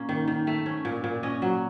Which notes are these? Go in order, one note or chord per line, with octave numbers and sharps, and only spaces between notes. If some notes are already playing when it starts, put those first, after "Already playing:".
Already playing: A#2 A#3 C#4
D#3
D#3
A3
C#4
A#2
A#2
C#4 D#5
F#3